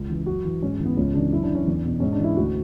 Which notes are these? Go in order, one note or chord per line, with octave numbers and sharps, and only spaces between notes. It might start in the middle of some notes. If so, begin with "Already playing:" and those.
Already playing: C#2
C#3 E3
F#2 F#4
E3
G#2 C#4
C#4
E3
B3
C#2 C#4
C#3 E3 D4
F#2 E4
D4
E3 C#4
E2 D4
B2
G#2 C#4
D4
E3
E4
D2 F#4